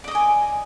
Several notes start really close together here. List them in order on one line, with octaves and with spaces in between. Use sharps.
D5 D#5 D6 G#5